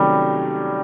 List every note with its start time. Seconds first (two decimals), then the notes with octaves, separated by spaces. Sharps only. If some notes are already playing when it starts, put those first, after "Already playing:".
Already playing: C3 D#3 F#3 G3 A3 C#4